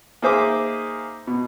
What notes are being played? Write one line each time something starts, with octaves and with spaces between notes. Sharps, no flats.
A#3 D#4 G#4 C5 E5 D6
B2